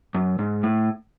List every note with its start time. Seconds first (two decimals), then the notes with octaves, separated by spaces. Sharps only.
0.15 F#2
0.39 G#2
0.63 A2